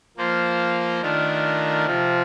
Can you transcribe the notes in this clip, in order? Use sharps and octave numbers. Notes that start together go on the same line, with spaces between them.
F3 A#3 F4 C5
D#3 A3 D4 F4 A#4
C3 F3 C4 F4